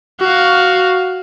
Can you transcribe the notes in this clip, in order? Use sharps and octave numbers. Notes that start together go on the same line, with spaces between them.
F#4 F5